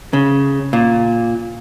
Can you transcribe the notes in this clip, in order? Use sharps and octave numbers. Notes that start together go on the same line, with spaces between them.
C#3
A#2